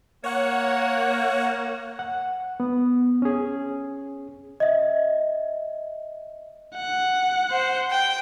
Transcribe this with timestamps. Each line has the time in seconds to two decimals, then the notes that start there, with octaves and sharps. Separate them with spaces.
0.24 A#3 C#5 F#5
1.99 F#5
2.60 B3
3.22 C#4 G#4
4.60 D#5 E5
6.76 F#5
7.51 C5
7.91 G5